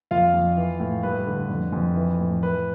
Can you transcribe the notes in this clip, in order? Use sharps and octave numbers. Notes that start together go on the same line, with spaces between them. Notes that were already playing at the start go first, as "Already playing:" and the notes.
F2 F4 F5
F2
E3
A2
G2 B4
D3
F2
F2
E3
A2
E3 B4